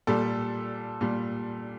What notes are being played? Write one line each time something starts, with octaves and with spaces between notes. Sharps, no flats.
A#2 G3 A4
A#2 G3